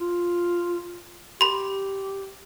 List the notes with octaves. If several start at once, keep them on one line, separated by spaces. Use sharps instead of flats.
F4
G4 B5 C6